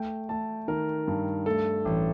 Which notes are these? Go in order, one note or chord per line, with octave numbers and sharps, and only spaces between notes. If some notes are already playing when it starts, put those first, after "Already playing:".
Already playing: A3 G5
A3 A5
D#3 A#4
G2
A3 A4
A1